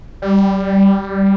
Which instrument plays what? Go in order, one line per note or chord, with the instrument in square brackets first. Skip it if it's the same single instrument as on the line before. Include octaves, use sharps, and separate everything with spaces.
[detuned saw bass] G3